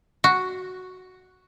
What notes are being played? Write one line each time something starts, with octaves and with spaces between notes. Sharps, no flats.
F#4